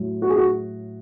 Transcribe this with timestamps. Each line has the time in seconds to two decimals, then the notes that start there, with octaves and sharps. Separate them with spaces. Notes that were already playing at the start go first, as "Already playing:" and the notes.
Already playing: A2 F#3
0.22 F#4
0.30 G#4
0.36 F#4